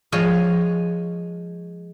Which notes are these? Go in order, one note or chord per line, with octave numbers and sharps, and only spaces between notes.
F3 G#3 C#5 D#5 F5